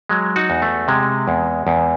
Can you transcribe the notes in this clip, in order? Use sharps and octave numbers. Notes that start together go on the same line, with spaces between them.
F#3 G#3
D#4 F#4
E2
A3
C3 G#3
E2
E2